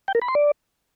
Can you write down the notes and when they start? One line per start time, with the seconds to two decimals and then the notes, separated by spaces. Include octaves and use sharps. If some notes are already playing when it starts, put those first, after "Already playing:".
0.08 G5
0.15 A#4
0.22 B5
0.28 C6
0.35 D5